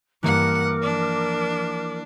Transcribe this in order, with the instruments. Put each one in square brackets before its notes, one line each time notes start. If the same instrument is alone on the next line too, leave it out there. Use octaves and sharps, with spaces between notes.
[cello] G2 F#5 [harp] E3 A#3 D#6 [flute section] A#4 D6 F6
[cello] F3 D4